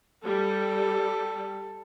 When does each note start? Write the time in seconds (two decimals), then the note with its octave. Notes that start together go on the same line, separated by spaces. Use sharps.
0.24 G3 A4